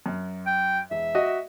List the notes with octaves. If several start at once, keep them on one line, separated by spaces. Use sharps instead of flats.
F#2
G5
E1 E5
F#4 D#5